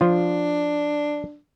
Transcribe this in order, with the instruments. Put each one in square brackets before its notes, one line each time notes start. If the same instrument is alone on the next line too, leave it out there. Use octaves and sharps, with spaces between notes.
[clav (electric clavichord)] F3 F4 [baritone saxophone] D4